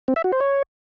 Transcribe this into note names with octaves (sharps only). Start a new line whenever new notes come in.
C4
E5
F#4
C5
C#5